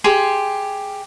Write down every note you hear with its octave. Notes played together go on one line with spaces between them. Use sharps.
G4 G#4 C6